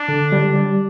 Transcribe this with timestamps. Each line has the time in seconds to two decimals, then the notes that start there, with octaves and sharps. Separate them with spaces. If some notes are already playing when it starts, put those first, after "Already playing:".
Already playing: D4
0.08 D3
0.32 G3
0.56 G3